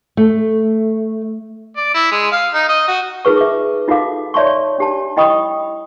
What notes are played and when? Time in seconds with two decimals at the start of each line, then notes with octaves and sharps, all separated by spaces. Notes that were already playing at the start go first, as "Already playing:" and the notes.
0.17 A3
1.77 D5
1.94 E4
2.11 G#3
2.32 F5
2.54 D#4
2.69 D#5
2.88 F#4
3.25 D#4 F4 G#4 B4 C#6
3.37 E5 D6
3.88 D#4 F4 F#4 A4 F5 D6
4.34 C#5 D5 E5 A5 C6 C#6
4.78 D4 G4 A5
5.17 E4 D#5 G5 B5 C#6 D#6